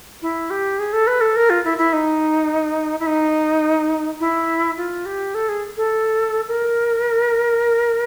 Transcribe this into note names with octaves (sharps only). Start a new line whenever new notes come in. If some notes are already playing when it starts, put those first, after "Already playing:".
E4
G4
G#4
A4
B4
A4
A#4
F4
E4
E4
D#4
E4
D#4
E4
F4
G4
A4
G#4
A4
A#4